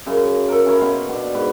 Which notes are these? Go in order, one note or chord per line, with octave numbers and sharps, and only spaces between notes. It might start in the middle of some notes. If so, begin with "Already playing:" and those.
F#2 C#3
A4 A#4
C#4 E4 C#5 A#5
B2 F5 B5 C6
B2 D4
G#2 F#4 B4